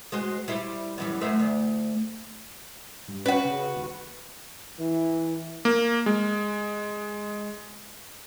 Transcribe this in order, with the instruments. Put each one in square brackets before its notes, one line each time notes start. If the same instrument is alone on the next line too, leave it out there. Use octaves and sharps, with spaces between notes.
[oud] G#3 F#4 C5
G3 E4 C5
F#2 E3 G3
F#2 A3 C5
D2
[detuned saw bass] G2
[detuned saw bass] C#4 [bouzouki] F#4 B4
[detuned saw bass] C#3
D#1
[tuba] E3
[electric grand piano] A#3
G#3